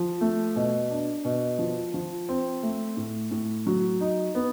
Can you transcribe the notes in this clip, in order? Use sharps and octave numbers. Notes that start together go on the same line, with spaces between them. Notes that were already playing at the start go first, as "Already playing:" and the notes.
Already playing: F3
A3
B2
D4
B2
F3
F3
C4
A3
A2
A2
F#3
D#4
B3